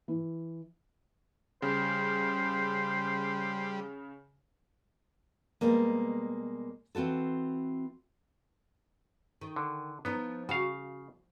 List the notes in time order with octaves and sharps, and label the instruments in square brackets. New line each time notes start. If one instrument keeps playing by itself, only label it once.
[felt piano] E3
[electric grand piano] C#3 [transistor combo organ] G3 [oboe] C5
[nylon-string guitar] B2 G3 G#3 A#3
E3 C4 F4 F#4 A4
[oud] D#3
[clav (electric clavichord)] D3
[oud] F3 D#4 [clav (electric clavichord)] B3
[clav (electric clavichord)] C#3 F5 [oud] F#4